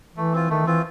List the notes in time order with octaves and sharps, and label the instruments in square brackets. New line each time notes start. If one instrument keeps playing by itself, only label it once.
[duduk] E3 [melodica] A3
[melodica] C4 F4
[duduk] D#3 [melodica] A3
[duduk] E3 [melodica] C4 F4